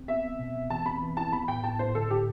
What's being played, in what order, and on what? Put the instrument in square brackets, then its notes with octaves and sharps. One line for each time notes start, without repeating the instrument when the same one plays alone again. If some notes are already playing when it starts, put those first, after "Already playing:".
Already playing: [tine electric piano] C4
[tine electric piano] B3 [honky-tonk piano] E5
[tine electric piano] B3
B2
B3
[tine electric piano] E3 [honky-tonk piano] A5
[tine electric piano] C4 [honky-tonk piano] B5
[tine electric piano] E3
[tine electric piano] E4 [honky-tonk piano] A5
[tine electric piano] B3 [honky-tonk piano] B5
[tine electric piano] A2 [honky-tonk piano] G5
[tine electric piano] A2 [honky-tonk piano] A5
[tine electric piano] A2 [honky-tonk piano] C5
[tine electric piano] D3 [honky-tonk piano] A4
[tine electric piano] D3 [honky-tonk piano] G4